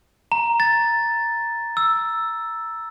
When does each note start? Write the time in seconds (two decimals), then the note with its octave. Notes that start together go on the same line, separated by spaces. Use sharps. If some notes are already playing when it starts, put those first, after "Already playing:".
0.32 A#5
0.60 A6
1.77 E6